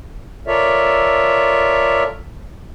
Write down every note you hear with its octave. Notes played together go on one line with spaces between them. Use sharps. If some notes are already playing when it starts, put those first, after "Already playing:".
F4 A4 A#4 C#5 D5 E5